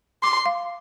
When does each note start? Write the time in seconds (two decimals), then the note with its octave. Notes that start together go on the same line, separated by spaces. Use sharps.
0.23 C6 D6
0.46 F5